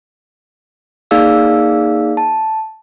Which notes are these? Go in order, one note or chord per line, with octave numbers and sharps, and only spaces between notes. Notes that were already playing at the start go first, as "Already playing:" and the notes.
A#3 D#4 G#4 D5 F5 E6
A5